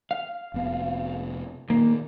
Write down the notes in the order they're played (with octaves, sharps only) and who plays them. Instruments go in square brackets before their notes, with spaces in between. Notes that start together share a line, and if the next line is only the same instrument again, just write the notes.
[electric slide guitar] F5
[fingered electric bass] F1 C3 B3
[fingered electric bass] A#2 D#3 [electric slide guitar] A#3